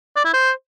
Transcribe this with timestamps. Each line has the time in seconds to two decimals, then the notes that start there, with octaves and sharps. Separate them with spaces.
0.16 D5
0.25 E4
0.34 C5